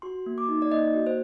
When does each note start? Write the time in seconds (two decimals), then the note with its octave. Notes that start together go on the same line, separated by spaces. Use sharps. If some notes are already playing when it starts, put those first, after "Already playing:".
0.02 F#4 C6
0.26 A#3
0.38 D6
0.49 D#4
0.62 D5
0.72 A#3 D#5
0.94 F#4
1.06 C5